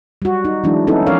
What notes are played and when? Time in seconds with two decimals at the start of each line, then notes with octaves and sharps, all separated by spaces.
0.22 G3 F#4
0.45 D#4
0.64 E3 F#3 G#3 D4 E4
0.87 B3 C#4 D#4 E4 A4
1.07 F3 C#4 A#4 C#5 D5 F5